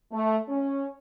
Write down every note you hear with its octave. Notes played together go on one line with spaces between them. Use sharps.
A3
C#4